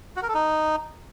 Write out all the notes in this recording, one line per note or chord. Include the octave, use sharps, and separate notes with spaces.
F#4
A#4
A4
D#4